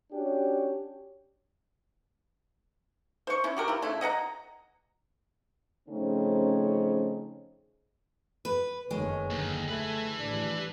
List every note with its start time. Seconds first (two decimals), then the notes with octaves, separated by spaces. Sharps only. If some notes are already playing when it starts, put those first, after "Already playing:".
0.12 C#4 D4 F#4 G4 C#5
3.27 C5 C#6
3.44 C#4 E4
3.57 F#4 G4 A#4
3.68 E4 F4
3.82 C#3 A3 E4
4.01 D#5 F#5 G5 A#5
5.88 C#3 F3 A3 C4 C#4 D#4
8.45 B4
8.91 F#1 F2 D#3 G#3 C#5
9.31 D#2 D3
9.69 A3 B4 G#5
10.19 A1 G3 D4